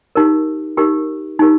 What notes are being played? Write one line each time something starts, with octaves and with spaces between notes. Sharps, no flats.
D#4 G4 A#4
D#4 G4 A#4
D#4 G4 A#4